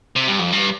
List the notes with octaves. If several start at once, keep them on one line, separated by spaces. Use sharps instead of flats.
C3
G2
F2
G2